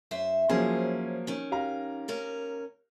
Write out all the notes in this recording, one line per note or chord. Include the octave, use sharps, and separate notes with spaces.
F#2 C5 E5
F3 F#3 A#3 C#4 G#4 C5
D#3 C#4
G4 F5 A#5
D#2 C#4 A#4